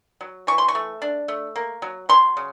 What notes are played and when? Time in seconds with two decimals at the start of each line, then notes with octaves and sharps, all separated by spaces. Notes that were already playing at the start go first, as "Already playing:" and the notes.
0.21 F#3
0.47 E3 C#6
0.58 C6
0.68 C#6
0.75 A3
1.02 D4
1.28 A3
1.56 A#3
1.82 F#3
2.09 F#3 C6
2.37 C#3